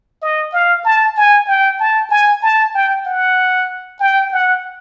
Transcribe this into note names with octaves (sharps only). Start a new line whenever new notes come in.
D#5
F5
A5
G#5
G5
A5
G#5
A5
G5
F#5
G5
F#5